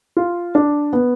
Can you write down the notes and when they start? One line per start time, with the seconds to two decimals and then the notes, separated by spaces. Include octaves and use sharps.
0.17 F4
0.55 D4
0.93 B3